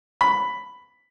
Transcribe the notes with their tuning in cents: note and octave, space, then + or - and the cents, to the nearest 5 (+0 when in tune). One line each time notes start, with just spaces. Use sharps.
B5 +5